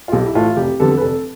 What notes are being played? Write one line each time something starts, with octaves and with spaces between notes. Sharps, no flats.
F4
B1 G4
E4
A2 E3 A3 F4
F1 G4
F2 D3 G3 B3 A4
B4
F1 A4